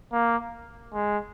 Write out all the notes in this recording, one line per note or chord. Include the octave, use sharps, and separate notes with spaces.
A#3
G#3